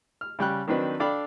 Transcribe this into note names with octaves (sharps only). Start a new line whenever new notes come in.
F6
C#3 G3 G5 F#6
D#3 F#3 C4 D4 D#4 B4
D4 A4 D5 F5 G5 B5